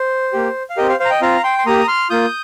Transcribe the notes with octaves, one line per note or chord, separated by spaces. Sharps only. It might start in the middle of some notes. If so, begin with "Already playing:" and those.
Already playing: C5
A#3 G4
F5
C4 G4 A#4 D#5
C5 F5
C5 F5
A#5
D#5 G5
C4 F4 F5 A#5
G5 C6
C6
A#3 G4 A#5 D#6
C6 F6
A#3 F4 D#6 G6